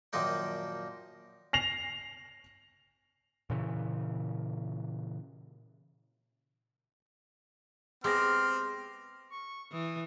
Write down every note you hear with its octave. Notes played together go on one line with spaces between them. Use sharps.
F#2 A#2 D#3 F3 A#3 D#4
A#6 C7 F7
A#2 C#3 E3
G#3 B3 C4 G4 C6 D6 F6 A#6
C#6
E3 D#6